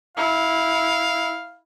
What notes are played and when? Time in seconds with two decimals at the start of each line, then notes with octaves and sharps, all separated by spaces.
0.17 E4 F5